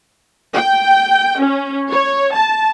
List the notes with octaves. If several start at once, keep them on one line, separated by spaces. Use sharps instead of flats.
G5
C#4
C#5
A5